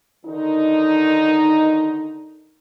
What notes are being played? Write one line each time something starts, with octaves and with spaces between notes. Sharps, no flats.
D3 D#3 D#4